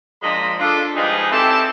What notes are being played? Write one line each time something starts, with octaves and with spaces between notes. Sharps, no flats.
A#2 F3 G#3 D4 D#5 B5
D4 F4 A4
F3 G3 G#3 D#4 G#4 B4
C4 E4 G4 A4 E5 A5